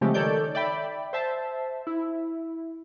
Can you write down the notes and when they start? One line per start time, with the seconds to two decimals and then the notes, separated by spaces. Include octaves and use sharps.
0.01 C#3 F3 G#3 A3 C4 G4
0.14 D#3 A4 C#5 D5 G6
0.55 D5 E5 G5 B5
1.13 C5 E5 A5
1.87 E4